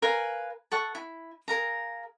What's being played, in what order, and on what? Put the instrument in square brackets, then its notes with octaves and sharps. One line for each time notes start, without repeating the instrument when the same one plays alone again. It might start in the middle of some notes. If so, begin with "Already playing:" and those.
[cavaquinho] A#4 B4 F5 G#5
A4 F#5 C#6
E4
G#4 A#4 F5 A#5